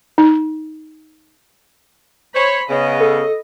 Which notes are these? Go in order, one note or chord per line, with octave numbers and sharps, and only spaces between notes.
D#4
C5 C#5 B5
C#3 B3 D#5
A4